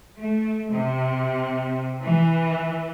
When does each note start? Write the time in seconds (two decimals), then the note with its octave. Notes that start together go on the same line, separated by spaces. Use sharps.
0.17 A3
0.71 C3
2.03 E3